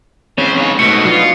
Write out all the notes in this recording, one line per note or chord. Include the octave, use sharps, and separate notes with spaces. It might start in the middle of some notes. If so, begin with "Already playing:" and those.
C#2 C#3 E3 C4 C#4 C5
B1 C#5
G#2 B2 A3 C#7
F#3 D4 D#4 F4